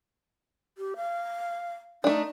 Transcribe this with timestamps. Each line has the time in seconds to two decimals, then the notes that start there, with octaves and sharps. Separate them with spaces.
0.78 G4
0.96 F5
2.04 A3 D4 D#4